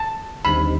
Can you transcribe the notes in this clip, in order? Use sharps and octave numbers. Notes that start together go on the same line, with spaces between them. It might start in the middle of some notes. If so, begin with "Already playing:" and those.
Already playing: A5
D#2 D3 G3 C4 D#4 B5